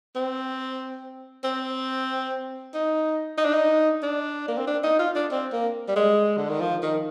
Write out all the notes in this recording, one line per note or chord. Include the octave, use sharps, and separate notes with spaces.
C4
C4
D#4
D#4
D4
D#4
D4
A#3
C4
D4
D#4
F4
D4
C4
A#3
G3
G#3
D3
D#3
F3
D#3